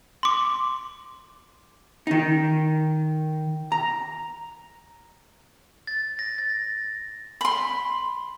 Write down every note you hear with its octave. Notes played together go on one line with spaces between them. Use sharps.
C6 D6
D#3 D#4
A#5
A6
A#6
A6
B5 C6